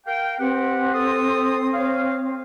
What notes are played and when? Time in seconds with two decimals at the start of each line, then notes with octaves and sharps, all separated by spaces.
0.07 A#4 F5 G5
0.39 C4 G4 B4 F#5
0.94 A4 C6 D#6
1.74 C5 C#5 F5